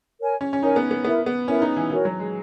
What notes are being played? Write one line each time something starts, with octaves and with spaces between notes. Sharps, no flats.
A#4 C#5 G#5
C#4
C#4
D#4 A#4 C#5 G#5
B3
B3
B3 E4 A#4 E5
B3
C#4 E4 A#4 E5
D#4
E3
E3 F#4 A#4 C#5
F#3
G#3